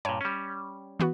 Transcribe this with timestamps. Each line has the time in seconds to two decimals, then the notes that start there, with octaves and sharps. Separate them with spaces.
0.05 G2 A#2 C#5
0.21 G3 C#4
1.00 E3 B3 F#4